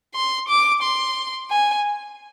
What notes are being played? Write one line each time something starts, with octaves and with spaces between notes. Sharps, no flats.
C6
D6
C6
G#5